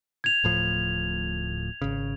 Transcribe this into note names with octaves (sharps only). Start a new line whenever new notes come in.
G#6 F7
D1 A2 F3
G#1 C#3